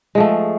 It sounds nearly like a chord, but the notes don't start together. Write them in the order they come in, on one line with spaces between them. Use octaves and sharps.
G#3 F3 A3